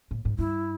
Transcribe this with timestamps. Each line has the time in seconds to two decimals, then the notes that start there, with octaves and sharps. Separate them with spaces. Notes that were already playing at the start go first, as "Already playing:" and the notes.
0.11 A2
0.25 G#2
0.39 G2 E4